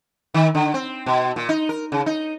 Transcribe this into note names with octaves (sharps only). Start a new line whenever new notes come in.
D#3
D3
C4
B2
A#2
D#4
A#4
C#3
D#4